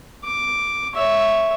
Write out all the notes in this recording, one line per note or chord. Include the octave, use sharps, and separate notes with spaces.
D6
C#5 E5